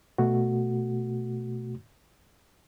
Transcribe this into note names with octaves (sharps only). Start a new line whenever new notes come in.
B2 A3 F#4